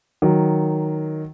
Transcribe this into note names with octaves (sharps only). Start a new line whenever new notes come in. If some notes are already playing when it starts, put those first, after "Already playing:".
D#3 F#3